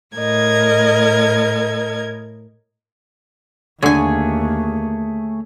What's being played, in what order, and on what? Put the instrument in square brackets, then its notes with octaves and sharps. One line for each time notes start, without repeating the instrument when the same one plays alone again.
[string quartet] A2 A#4 D#5 G#6
[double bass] D#2 [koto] D3 G#5 [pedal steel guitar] A3 G#4 C#5